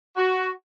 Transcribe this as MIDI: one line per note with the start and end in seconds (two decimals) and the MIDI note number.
0.16 0.50 66